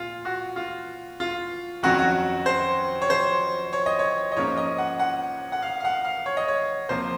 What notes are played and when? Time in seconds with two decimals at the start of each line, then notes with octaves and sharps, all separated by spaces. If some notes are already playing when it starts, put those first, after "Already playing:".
Already playing: A#2 F4
0.25 F#4
0.56 F4
1.20 F4
1.83 F2 D#3 F#3 C#4 F#4
1.99 F#4
2.46 C5
3.02 C#5
3.10 C5
3.73 C#5
3.86 D#5
3.99 C#5
4.32 D#5
4.37 G#2 F3 A#3 C#4 C#5
4.57 D#5
4.78 F#5
5.00 F#5
5.52 F#5
5.62 F5
5.80 F5
5.85 F#5
6.05 F5
6.26 C#5
6.37 D#5
6.48 C#5
6.89 C3 F3 A#3 C5